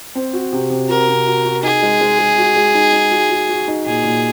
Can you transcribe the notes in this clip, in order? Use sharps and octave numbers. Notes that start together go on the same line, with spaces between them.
C4
F#4
C3
C3
F#4 A#4
C3
F#4
F#4
D#4 G#4
G#3
G#3
G#3
F#4
G#3
D#4
D#4
F#4
F#4
F#4
D#4
A#2 G#4
A#2